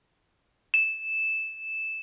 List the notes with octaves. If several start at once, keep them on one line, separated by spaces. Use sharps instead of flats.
E7